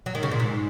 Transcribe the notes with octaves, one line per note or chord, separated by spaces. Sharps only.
F#3
D#3
C#3
A#2
G#2